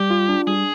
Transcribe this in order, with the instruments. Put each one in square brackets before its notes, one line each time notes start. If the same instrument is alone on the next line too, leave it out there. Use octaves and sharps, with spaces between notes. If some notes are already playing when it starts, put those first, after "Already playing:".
Already playing: [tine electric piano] G3 [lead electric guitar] G4
[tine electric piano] F4
D4
[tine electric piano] G3 [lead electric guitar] G#4